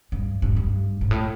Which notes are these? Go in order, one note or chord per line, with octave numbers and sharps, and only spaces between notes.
G2
G2
G2
G#2
A2